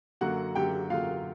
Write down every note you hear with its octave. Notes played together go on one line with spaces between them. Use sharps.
F#2 D3 F#3 A#3 F#4 F#5
F#2 D3 F#3 A#3 G4 G5
F#2 D3 F#3 A#3 F4 F5